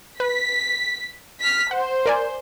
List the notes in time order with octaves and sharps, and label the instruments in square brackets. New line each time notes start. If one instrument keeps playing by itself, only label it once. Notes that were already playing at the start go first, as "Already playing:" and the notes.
[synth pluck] B4 [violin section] B6
[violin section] F6 B6
[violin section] C5 [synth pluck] F#5
[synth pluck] A#4 D5 G#5